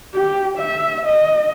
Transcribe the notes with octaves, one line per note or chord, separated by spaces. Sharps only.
G4
E5
D#5